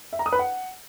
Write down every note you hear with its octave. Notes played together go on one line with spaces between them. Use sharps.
E5
A#5
D#6
B4
F#5